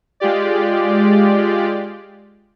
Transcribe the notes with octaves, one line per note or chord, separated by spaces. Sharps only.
G#3 F4 G4 D5